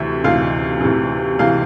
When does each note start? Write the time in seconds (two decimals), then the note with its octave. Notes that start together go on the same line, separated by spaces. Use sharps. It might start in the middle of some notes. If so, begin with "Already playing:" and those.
Already playing: D2 C3 E3 E5
0.24 D2 C3 E3 F5
0.81 D2 C3 E3
1.39 C3 E3 F5